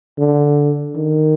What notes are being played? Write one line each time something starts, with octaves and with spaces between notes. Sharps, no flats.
D3
D#3